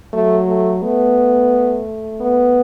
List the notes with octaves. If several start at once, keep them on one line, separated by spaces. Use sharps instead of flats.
F#3 A3
A3
A3 B3
B3